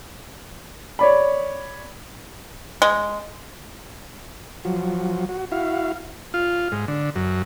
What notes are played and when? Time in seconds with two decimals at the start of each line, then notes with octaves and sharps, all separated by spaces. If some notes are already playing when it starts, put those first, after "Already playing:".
0.99 C#5 D5 B5
2.82 G#3
4.65 F3 F#3
5.29 F#4
5.52 E4 F#4 F5
6.34 F4
6.72 G#2
6.88 D3
7.16 F#2